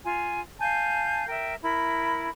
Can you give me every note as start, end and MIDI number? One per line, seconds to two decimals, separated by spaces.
0.05 0.40 65
0.05 0.40 80
0.60 1.25 77
0.60 1.25 80
0.60 1.25 81
0.60 1.25 91
1.27 1.55 70
1.27 1.55 76
1.27 1.55 79
1.63 2.28 64
1.63 2.28 70
1.63 2.28 83